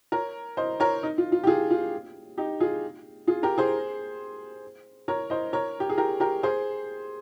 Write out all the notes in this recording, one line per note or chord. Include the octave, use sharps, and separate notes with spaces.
A#4 C#5
C5 D#5
A#4 C#5
D#4
F4
F4
G4
F4 G#4
F4
D#4 G4
F4 G#4
F4 G#4
G4 A#4
G#4 C5
A#4 C#5
C5 D#5
A#4 C#5
G4
G#4
G4 A#4
G4 A#4
G#4 C5